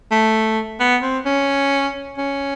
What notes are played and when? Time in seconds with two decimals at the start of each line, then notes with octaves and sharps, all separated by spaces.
0.11 A3
0.80 B3
1.03 C4
1.26 C#4
2.18 C#4